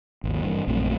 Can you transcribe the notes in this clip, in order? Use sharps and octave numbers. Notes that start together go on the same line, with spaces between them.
G#1 D#2
G2 E3
A#1 F#2 A3 C4